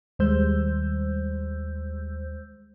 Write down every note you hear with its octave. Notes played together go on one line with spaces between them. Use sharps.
D#2 G3 G#3 C5 E6 G6